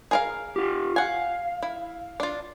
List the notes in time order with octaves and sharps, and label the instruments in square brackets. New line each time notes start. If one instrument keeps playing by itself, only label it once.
[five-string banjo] G#4 A#4 F5
[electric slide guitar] F4 G4
[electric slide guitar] F5 [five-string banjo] F#5 G#5
[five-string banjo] E4
D4 F4